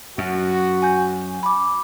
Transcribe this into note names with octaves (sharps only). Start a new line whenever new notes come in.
F#2 F#4
G#5 G6
B5 D6